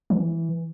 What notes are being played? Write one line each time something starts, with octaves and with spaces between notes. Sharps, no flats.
E3